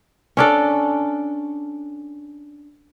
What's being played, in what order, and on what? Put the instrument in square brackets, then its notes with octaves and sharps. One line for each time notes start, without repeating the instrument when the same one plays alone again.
[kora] C#4 D4 A4